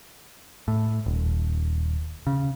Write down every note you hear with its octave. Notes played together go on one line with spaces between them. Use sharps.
A2
D#1
C#3